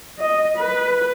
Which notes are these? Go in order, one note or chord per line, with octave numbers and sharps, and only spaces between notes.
D#5
B4